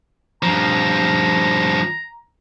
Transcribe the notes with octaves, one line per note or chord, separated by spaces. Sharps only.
G2 F3 A#5